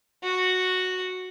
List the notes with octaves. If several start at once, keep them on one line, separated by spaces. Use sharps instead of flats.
F#4